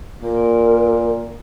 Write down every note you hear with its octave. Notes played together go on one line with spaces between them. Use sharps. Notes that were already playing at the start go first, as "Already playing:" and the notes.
A#2 A#4